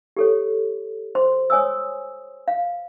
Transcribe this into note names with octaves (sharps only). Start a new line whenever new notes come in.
G4 A4 C#5
C5 C6
C#5 G#5 D#6 E6
F5